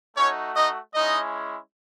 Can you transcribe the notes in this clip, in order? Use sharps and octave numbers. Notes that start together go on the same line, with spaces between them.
A3 C#4 D#4 F#4 C#5
D#4 D#5
G#3 C#4 D#4 E4 D#5